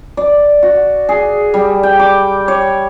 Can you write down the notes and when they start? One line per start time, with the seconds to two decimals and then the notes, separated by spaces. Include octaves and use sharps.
0.17 D5
0.63 F#4
1.09 G#4
1.54 G3
1.83 G5
2.00 D6
2.48 C#5